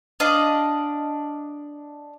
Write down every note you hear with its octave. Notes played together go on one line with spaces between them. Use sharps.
D4 D#5 F5